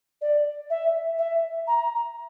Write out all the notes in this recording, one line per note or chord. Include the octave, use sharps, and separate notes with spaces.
D5
E5
E5
A#5